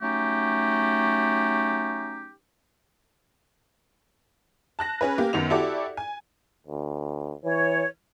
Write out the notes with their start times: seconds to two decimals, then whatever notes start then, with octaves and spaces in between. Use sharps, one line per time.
0.02 F#3 A3 C#4 D#4 G4
4.79 A5 F#6 A#6
5.01 C#4 G#4 B4
5.18 A#3 G4
5.33 F#2 D#3 B3 F7
5.50 E4 F#4 G4 A4 D5 D6
5.97 G#5
6.67 D2
7.44 E3 C#5